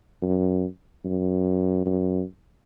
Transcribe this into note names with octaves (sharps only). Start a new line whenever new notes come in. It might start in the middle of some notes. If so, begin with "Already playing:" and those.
F#2
F#2
F#2